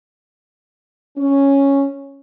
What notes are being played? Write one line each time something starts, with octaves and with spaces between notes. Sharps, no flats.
C#4